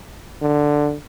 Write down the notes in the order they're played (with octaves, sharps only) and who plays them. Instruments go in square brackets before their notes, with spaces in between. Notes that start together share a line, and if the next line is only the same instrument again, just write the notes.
[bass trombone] D3